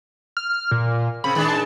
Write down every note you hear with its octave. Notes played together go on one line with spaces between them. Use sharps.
F6
A#2
C#3 C4 B5
D#3 G#3 D4
A5